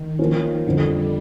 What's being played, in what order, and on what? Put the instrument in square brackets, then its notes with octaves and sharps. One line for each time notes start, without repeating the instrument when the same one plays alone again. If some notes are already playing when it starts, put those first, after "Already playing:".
Already playing: [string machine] D#3
[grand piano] F3 A#3 C#4
[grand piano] F2 D3 F3 [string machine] G3